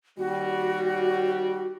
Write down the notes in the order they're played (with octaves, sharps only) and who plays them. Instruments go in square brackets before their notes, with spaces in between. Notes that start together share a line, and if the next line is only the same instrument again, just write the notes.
[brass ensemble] D#2 G3 [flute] F#4